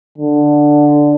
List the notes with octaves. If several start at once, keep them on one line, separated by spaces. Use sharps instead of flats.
D3